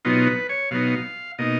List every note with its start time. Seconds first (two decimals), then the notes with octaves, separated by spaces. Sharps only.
0.05 B2 F#3 B3 D#4 F4
0.27 B4
0.49 C#5
0.71 B2 F#3 B3 D#4 F5
1.39 B2 A#3 D#4 D#5